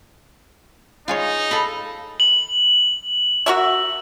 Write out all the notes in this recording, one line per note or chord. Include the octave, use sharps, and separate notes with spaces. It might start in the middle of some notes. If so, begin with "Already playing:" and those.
D#4 F4 G#4 C#5
A4 F5 B5
F#7
F#4 A#4 E5